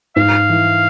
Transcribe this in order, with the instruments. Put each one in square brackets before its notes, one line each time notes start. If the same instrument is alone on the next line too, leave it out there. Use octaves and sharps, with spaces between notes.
[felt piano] G#2 [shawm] F5
[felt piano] E3